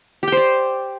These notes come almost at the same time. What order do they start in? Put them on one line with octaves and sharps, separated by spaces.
G4 G5 C5 D5